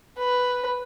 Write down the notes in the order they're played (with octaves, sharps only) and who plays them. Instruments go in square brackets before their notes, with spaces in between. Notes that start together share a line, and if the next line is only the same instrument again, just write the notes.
[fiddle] B4